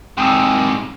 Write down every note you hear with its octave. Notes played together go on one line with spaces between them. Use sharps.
G#2 C3 G5 D#6 E6